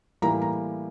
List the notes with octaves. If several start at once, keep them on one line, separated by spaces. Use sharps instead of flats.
A2 E3 G3 A#3 A#5
A#5